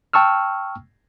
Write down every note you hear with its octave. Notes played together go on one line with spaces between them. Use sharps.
G5 A5 C#6 E6 F6